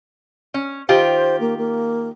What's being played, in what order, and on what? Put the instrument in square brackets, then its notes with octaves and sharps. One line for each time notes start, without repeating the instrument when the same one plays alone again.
[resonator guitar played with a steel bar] C#4
[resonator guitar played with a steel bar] D#3 F4 G4 [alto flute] C5
[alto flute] A#3
A#3